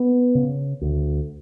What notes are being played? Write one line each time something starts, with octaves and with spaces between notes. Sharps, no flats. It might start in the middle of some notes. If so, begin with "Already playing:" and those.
Already playing: B3
C#3
D2